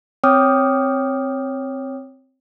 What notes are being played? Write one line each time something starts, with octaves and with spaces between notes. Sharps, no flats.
C4 C#5 G5 D6 D#6 F6